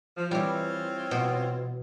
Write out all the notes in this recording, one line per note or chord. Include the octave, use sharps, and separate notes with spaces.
F3
E3 G3 C4 F4 C#5
B2